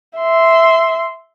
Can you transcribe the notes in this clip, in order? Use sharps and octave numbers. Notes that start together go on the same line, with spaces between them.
E5 C6